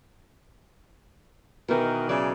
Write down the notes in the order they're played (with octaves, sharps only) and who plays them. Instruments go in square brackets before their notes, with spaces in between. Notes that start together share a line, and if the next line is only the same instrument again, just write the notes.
[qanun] B2 D#4 [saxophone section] D#3 E3 A#4
[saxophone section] C#3 E3 D5 [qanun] F#3 A4